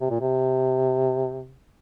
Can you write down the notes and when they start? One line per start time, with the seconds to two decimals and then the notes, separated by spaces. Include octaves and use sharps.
0.01 C3
0.10 A#2
0.21 C3